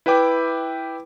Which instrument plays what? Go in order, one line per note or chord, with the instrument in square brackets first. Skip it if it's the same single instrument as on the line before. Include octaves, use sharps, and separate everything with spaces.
[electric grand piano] E4 B4 E5 G5 D6